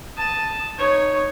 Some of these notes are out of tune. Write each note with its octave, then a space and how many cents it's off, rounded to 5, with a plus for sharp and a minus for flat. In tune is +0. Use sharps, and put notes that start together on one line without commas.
A5 +0 D#6 +0
D#4 -15 C#5 +0